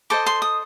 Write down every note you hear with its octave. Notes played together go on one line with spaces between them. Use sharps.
A4 C5 D#5 D6
C6
D#6